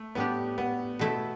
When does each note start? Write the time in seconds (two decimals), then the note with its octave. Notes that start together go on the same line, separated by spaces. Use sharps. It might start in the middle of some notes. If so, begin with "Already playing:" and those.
Already playing: A3
0.15 A2 G3 B3 D4 G4
0.58 B3
0.99 B2 A3 E4